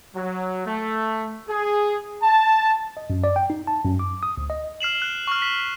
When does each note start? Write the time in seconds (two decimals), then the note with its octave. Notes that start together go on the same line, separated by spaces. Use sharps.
0.16 F#3
0.66 A3
1.49 G#4
2.23 A5
2.97 D#5
3.10 F#2
3.24 D5
3.36 G5
3.50 D#4
3.67 A5
3.85 F#2
3.99 D6
4.23 D#6
4.38 D2
4.50 D#5
4.80 F6 C7 E7 F#7
5.02 F#6
5.27 C#6 F6
5.42 B6 E7